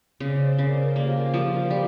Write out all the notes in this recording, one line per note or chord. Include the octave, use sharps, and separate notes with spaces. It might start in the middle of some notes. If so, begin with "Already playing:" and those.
C#3 C5 D5
C#3 A#4 C5
A#3 F4 G4
F3
G3